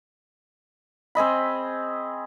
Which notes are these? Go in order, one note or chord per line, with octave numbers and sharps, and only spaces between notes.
C4 G#4 D#5 B5